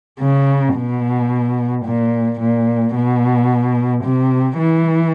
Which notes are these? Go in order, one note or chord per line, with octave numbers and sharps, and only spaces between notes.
C#3
B2
A#2
A#2
B2
C3
E3